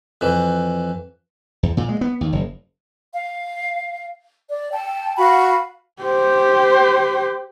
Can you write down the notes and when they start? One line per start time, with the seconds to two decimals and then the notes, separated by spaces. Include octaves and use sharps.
0.21 F2 E3
1.63 E2
1.77 A#2
1.89 G#3
2.01 B3
2.21 D#2
2.33 F#1
3.15 F5
4.49 D5
4.72 G5 A5
5.18 F#4 F5 F#5 B5
6.03 G4 C5